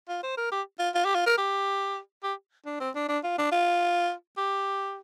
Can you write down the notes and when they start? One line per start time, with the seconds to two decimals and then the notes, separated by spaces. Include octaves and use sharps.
0.09 F4
0.23 C5
0.37 A#4
0.52 G4
0.79 F4
0.94 F4
1.05 G4
1.15 F4
1.26 A#4
1.38 G4
2.24 G4
2.66 D4
2.80 C4
2.95 D4
3.09 D4
3.24 F4
3.38 D4
3.52 F4
4.38 G4